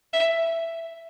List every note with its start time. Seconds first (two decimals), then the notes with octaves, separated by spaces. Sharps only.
0.13 E5